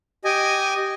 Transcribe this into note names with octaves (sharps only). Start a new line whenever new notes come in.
G4 D#5 G#5